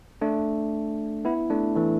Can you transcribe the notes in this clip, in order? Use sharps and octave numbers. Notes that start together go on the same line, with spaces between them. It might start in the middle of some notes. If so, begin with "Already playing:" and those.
A3 D4
B3 E4
A3 D4
E3 A3